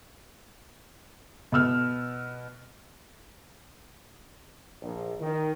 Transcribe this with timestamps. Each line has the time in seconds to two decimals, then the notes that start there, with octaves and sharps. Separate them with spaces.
1.52 B2 B3 E6 F6
4.82 A#1
5.20 D#3